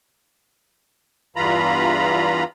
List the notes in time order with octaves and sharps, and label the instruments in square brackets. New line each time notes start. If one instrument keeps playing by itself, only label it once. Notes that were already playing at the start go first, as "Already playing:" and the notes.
[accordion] E2 G2 E3 F4 A#5 B5